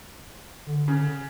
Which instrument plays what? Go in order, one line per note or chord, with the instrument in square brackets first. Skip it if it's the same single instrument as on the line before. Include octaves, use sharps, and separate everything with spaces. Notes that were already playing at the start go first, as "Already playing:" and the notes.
[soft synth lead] D3
[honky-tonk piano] C#3